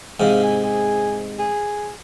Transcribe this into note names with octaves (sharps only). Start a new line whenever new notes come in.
G#2 C3 F5
G#5
G#4
G#4